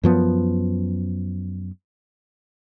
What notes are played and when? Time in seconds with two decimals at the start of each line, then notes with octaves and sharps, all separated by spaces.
0.03 F#2 F3 B3